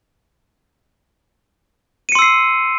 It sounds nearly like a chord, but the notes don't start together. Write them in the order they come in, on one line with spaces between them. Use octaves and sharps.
D#7 C#7 C6 E6 C7